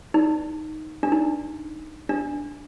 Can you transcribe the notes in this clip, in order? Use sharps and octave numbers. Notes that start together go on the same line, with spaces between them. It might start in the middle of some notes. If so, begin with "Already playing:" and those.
D#4
D4
D#4
D4